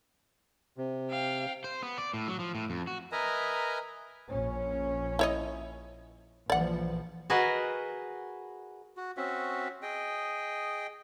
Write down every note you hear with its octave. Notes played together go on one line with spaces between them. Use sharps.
C3
F5 G5
C5
B3
D5
A2
F#3
F3
A2
F2
F#4
A#4 B4 D#5 E5 G#5 A#5
A#1 C#4
E4 C#5 D#5
A#1 E3 F3 D5 F#5
F#4 G#4 A#4 B4 D#5 F#5
F#4
C4 C#4 F#4 E5
G#4 D#5 G5